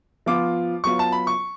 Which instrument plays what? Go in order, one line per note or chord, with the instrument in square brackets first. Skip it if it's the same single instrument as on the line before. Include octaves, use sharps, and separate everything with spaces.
[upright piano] F3 B3 F4 [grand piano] D6
[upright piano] F#3 B3 F4 [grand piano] C#6
[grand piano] A5
B5
C#6